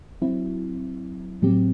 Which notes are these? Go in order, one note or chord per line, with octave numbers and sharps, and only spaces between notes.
F#3 C4 E4
A2 F#3 C4 G4